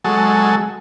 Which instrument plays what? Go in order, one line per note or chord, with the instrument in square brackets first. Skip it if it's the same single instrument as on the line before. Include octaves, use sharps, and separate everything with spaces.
[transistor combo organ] F#3 G#3 A4